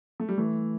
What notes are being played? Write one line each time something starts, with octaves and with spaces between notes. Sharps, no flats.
A3
G3
E3 A3